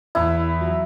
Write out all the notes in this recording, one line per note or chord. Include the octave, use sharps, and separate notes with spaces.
E2 E4
F#3